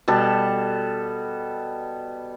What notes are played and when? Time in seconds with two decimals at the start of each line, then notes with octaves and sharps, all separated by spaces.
0.08 B2 G3 A4 A5